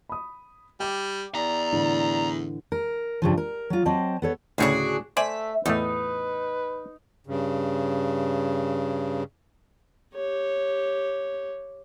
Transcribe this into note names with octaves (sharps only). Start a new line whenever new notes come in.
B5 D#6
G3 G5 D6
E2 D5 A#5
A2 D3 E3
A#4
G2 C#3 F3
A#4
F#3 F4
F#3 C4 D#5 G5 A5
B3 A4 C#5
D2 A2 C#3 D4 F#4 G#4
A3 C5 D5 E5 G#5
E2 A2 A3 D#4 B4
G2 C#3
G4 C#5